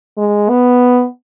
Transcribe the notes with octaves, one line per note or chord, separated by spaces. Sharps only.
G#3
B3